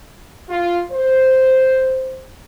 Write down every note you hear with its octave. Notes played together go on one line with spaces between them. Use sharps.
F4
C5